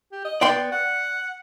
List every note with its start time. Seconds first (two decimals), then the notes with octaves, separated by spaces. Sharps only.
0.12 G4
0.25 D#5
0.41 B3 D5 G5 C6
0.72 F#5